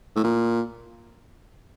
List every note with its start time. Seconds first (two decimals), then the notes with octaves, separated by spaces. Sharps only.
0.16 A2
0.24 A#2